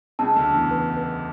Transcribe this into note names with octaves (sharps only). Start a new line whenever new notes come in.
C#2 C#3 A5
D2 D3
A5
E2 E3
B4
B4